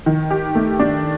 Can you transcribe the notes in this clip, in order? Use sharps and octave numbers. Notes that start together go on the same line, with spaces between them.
D#3
G4
A3
D4